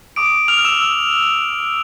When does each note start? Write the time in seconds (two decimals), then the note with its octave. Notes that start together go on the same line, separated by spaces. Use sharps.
0.16 D6 D#6 D7
0.48 D#6 F6 F7
0.65 E6 E7